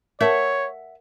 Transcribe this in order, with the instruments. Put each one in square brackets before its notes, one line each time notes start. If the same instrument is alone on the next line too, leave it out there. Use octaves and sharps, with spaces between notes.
[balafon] A#4 A5 [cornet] C#5 [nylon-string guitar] E5 F#5